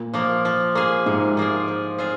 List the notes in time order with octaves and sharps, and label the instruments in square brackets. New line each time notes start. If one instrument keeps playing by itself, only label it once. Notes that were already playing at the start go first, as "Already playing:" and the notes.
Already playing: [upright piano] A#2
[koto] F3 A#3
F3
A#3 G#4
[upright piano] G#2 [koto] C3
[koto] F3 A#3 G#4
F3
C4 F4 G#4